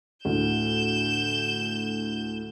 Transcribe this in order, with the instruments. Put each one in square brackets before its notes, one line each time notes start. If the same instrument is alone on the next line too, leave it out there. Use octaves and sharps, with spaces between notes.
[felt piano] D2 A2 [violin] G6 E7